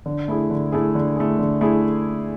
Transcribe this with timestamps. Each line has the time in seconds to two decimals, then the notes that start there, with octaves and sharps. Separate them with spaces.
0.06 D3
0.28 A3 E4 G#4
0.50 D3
0.72 A3 E4 G#4
0.95 D3
1.17 A3 E4 G#4
1.39 D3
1.61 A3 E4 G#4